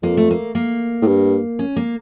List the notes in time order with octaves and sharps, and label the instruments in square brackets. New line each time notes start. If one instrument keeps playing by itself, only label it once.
[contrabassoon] F2 [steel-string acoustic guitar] A#3
[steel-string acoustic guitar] A3
A#3
A#3
[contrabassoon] A2
G2
[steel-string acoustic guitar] C#4
A#3